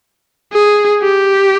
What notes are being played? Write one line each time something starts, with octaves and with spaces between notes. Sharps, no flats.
G#4
G4